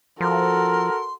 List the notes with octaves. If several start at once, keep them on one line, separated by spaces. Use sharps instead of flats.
F3 F#4 A4 A#4 C6